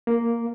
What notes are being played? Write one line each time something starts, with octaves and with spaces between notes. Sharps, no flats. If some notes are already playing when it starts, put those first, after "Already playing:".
A#3